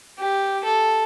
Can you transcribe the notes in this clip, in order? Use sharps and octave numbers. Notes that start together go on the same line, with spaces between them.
G4
A4